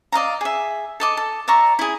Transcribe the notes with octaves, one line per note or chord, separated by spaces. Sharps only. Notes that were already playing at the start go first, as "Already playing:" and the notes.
D5 D#5 F5 A#5
G#4 E5
A4 D#5 D6
A4
D5 E5 A#5 C#6
E4 G#4